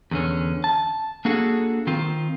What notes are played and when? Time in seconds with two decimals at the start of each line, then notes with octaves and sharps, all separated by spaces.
0.11 E2 D3 C#4
0.64 A5
1.25 A#3 D4 F#4 G#4 A4
1.87 D#3 C4 F4